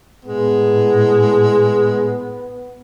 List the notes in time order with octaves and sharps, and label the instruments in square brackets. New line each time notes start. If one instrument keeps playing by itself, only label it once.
[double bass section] A2 [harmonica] G#3 [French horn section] B3